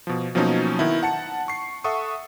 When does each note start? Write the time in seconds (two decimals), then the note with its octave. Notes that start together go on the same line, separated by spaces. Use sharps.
0.07 B2 F3
0.35 B2 F3 F#3 A#3 C#4 D#4
0.79 D#3 B3 E4
1.03 F#5 A5 C#7
1.48 C#6 C7
1.84 A4 E5 F#5 C#6 D#6